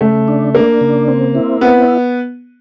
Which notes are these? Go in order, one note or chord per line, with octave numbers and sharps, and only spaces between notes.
C#3 A3
D4
A#3 D4
C#3
C4
E4
B3 C4